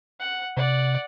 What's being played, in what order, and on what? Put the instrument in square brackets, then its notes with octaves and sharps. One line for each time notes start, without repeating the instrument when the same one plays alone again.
[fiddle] F#5
[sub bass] C3 [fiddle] D5 F#5